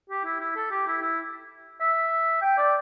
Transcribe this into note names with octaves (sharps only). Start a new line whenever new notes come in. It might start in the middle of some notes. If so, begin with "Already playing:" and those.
G4
E4
E4
A4
G4
E4
E4
E5
G5
D5